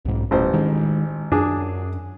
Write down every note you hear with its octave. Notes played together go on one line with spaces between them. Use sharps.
B1 G#2
D#1 A1 C5
D#3 G#3
F#2 D4 G#4